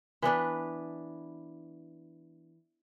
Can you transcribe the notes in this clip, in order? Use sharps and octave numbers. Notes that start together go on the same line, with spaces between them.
E3 B3 D4 B4